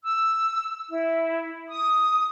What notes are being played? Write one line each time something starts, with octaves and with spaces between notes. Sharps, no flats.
E6
E4
D#6